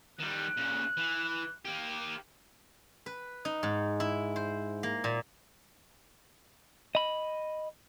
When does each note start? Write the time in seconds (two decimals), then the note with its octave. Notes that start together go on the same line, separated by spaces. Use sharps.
0.19 D#3 G3 F#6
0.57 A#2 C#3
0.97 E3
1.65 A#3 G4
3.06 B4
3.45 D#4
3.63 G#2
4.00 E4
4.36 C5
4.83 A#3
5.04 A#2
6.95 D#5 B5